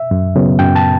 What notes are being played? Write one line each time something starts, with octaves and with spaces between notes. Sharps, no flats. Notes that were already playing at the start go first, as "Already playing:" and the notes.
Already playing: E5
F#2
C#3 F#3 B3
F#2 G5
A5